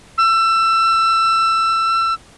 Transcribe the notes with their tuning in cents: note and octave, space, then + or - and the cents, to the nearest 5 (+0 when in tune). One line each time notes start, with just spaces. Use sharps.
E6 +20